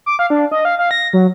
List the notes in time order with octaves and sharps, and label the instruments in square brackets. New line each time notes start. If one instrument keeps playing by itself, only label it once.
[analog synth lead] D6
F5
D4
D#5
F5
F5
A#6
F#3